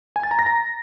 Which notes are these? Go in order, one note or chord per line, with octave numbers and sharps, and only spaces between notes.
G#5
A6
A#5
A#6
A#5